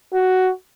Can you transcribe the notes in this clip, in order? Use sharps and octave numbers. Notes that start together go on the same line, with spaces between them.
F#4